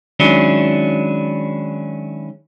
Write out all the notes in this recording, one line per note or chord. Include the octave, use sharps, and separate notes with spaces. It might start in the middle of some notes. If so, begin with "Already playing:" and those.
D#3 F#3 G#3 C#4 D4 E4